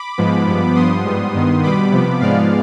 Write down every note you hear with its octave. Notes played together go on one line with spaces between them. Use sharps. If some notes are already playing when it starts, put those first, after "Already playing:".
Already playing: B5 D6
G#2 F3 G#3 B3
G2 F3 B3
G2 F3 B3 C6 D#6
G#2 G3 B3
G2 D#3 B3
B2 G3 B3 B5 D6
C3 F3 B3
G#2 F3 G#3 B3 D5 F5